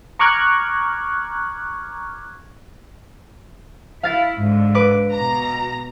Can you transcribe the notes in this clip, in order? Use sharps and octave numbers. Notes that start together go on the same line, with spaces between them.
A#5 C#6 D6 F6 F#6 G#6
E4 F5 A6
G#2 D3
B4 D6
B2 A#5